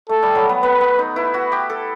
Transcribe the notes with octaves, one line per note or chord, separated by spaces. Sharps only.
A3 A4
G3
F#3
B3
B3 B4
B3
D#4
E4 B4
F#4
G4
A4